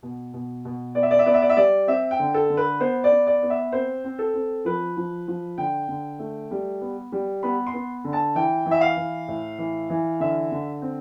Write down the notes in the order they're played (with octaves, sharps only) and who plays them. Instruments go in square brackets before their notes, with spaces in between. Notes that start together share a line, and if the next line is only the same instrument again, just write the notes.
[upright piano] B2
B2
B2
B3 D5
E5
D5
E5
B3 D5
E5
D5
E5
G3 D5
C4 E5
G5
D3
A4
D3
B4
B3 C5
D5
B3
D5
B3
E5
C4 C5
C4
A4
C4
F3 B4
F3
F3
D3 G5
D3
A3
G3
B3
G3
B3 B5
C6
B3
D3
A5
E3 G5
E3
E5
F5
E3
A2
E3
E3
D3 E5
D3
C4